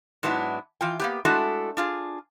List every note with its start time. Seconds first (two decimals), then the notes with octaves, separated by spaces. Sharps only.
0.23 G#2 F#3 B3 D4 E4
0.81 E3 F4 G5
1.00 A#3 B3 G4
1.25 G#3 A3 D4 E4 F#4 A4
1.77 D4 F4 G#4